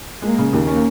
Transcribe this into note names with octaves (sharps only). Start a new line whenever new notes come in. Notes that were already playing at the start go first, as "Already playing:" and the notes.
G#3 A#3
C#3
D#2 A#3
C#4